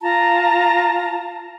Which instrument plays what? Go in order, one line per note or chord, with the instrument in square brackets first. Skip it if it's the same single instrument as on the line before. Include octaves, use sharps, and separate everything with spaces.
[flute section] F4 A5 A#5